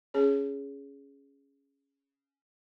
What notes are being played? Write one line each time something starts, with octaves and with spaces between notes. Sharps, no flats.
C#4 G#4 C#5